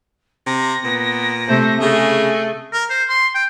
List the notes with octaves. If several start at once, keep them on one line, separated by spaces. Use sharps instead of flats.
C3 A#6
A#2 B3
C3 A3 C5
C#3 A3 G#4
A#4
C5
C6
G5